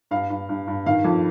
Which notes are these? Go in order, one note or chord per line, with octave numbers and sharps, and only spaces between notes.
G2 F5
G2
G2
G2
D#3 F5
F2